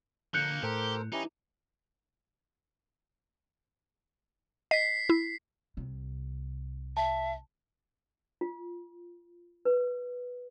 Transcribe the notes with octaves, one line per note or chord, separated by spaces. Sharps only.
D3 F3 A#3 F#6 G6 C#7
A2 G4 A4 A#4 C5
E3 C#4 D#4 E4 G4
D#5 B6 C7
E4
C2 C3
E5 A5
F4
B4